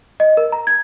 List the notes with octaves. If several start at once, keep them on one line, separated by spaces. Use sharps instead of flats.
D#5
A#4
A#5
G#6